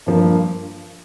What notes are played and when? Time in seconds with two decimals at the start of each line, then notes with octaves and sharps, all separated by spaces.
0.06 G2 F3 A#3